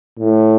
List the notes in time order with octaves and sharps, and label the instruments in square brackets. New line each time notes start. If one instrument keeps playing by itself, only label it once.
[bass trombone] A2